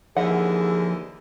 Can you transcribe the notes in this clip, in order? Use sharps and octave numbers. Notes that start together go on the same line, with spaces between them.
D#2 D3 E3 F3 G#4 F#5